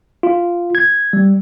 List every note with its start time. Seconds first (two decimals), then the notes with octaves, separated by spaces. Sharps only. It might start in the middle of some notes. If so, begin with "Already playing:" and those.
0.23 F4
0.75 G#6
1.13 G3